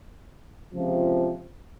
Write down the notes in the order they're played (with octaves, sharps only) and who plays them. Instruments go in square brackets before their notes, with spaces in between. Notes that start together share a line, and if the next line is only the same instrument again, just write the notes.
[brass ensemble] C#2 C3 F3